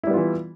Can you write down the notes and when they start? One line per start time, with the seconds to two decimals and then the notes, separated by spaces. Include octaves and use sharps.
0.03 E4
0.07 G3
0.10 B3
0.14 F4
0.17 E3